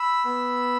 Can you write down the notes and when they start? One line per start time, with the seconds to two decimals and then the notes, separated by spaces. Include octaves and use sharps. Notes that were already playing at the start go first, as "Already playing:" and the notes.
Already playing: B5 E6
0.25 B3